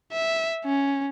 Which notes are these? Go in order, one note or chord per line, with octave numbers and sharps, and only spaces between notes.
E5
C#4